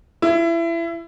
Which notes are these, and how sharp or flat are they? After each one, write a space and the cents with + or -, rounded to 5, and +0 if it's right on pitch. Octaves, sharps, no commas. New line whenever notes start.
E4 +25